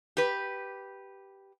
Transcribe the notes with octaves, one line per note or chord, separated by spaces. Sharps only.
G4 B4